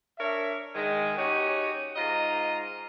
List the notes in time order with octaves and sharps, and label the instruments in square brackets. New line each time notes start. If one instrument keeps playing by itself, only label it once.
[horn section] D4 A#4 C#5 E5
D#3 G#3
C#4 D#4 F#4 G4 C#5
G#2 F4 D#5 A#5